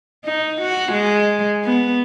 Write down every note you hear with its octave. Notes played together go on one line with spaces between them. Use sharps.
D#4
F#4
G#3
B3